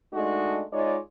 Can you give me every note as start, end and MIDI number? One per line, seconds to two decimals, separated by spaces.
0.13 0.62 56
0.13 0.62 57
0.13 0.62 62
0.13 0.62 63
0.13 0.62 66
0.72 0.97 56
0.72 0.97 63
0.72 0.97 65
0.72 0.97 73
0.72 0.97 74